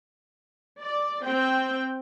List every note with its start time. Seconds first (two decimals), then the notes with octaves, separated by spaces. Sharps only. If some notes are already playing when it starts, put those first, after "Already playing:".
0.80 D5
1.25 C4 G5